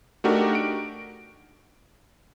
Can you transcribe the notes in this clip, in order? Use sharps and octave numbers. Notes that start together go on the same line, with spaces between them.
A3 D4 D#4 F#4 G4 A#4
D7